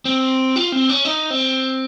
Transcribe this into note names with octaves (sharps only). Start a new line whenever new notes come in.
C4
F4
C4
C#4
D#4
C4